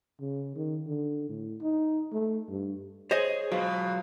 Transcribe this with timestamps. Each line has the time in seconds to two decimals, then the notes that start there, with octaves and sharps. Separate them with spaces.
0.21 C#3
0.55 D#3
0.87 D3
1.29 A2
1.61 D#4
2.12 A3
2.49 G2
3.11 G#4 C5 C#5 D#5
3.52 B2 F#3 F4